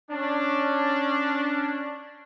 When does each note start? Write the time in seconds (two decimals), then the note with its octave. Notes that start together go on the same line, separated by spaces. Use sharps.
0.11 C#4 D4